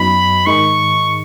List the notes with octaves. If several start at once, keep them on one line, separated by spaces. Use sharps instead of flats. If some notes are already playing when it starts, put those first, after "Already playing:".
Already playing: F#2 F#3 B3 D#4 B5
G#2 D#3 G#3 D#4 C#6